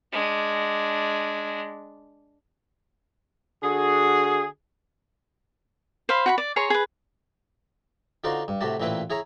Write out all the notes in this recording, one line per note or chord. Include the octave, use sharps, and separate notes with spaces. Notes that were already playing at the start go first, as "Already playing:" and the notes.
G#3 D4
D3 F#4 G#4
C5 F5 B5
F#4 G5 B5
D5
G#4 C#5 A#5 C6
G#4 B4
D3 D#4 F4 F#4 C5 D5
G2
A2 C3 F#4 G4 A5
A1 A#2 C4 E4 B4 G5
E4 G#4 C#5 A#5